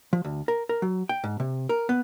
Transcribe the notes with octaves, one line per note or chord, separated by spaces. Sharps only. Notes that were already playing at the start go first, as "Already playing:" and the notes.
F3
D2
A#4
A#4
F#3
G5
G#2
C3
A#4
B3